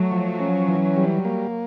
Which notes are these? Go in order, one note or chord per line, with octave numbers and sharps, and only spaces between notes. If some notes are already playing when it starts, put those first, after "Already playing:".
Already playing: F#3 A3
F3
C#4
E3
G3
A#3